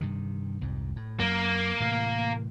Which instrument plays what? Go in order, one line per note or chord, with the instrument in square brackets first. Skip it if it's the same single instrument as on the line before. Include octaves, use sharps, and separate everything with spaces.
[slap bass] G2 C3 D#3
C2 F2 G#2
A2
[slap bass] F#2 F#3 [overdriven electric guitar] A#3
[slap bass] A2 C3 E3